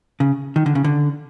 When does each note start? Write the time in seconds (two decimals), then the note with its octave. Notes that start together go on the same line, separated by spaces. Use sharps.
0.20 C#3
0.56 D#3
0.66 D3
0.75 C#3
0.84 D3